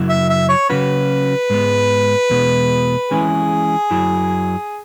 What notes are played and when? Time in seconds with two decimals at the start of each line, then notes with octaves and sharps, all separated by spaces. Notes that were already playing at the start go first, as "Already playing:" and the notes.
Already playing: F#2 C#3 F#3 E4
0.09 E5
0.30 E5
0.49 C#5
0.69 C#3 F#3 C#4 F#4 B4
1.50 G#2 G#3 B3
2.30 E2 B2 G#3
3.11 E3 G#3 C#4 E4 G#4
3.91 F#2 F#3 E4